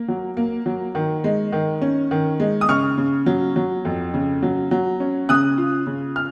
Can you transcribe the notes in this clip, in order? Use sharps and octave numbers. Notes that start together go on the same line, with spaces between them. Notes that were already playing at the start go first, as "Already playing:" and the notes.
Already playing: A#3
F#3
A#3
F#3
D#3
G#3
D#3
C#4
D#3
G#3
D#6
C#3 C#6 F6
C#3
F#3
F#3
F2
C#3
F#3
F#3
C#4
C#3 D#6 F#6
F4
C#3
F6